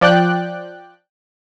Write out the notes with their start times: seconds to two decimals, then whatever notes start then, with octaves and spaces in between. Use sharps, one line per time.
0.01 F3 D5 G5 F#6